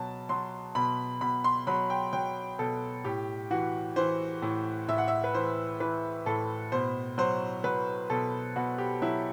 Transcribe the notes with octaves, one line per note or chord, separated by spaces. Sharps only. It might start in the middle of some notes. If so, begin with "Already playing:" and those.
Already playing: B2 F#3 A5
F#3 C6
B2 B5
B2 B5
C6
F#3 B5
G5
F#3 G5
B2 A4
A2 G4
E3 F#4
E3 C5
A2
A2 E5
F#5
E5
B4
E3 C5
E3 B4
A2 A4
B2 C5
F#3 C5
F#3 B4
B2 A4
B2 F#4
G4
F#3 E4